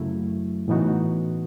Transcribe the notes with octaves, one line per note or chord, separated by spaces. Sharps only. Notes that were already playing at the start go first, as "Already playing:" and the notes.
Already playing: F#2 C#3 F#3 A3 E4
A2 E3 B3 D#4 F#4